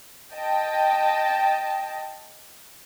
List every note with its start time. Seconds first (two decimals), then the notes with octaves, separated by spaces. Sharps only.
0.34 D#5 G5 A5